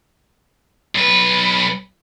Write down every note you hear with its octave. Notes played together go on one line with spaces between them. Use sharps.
B1 B4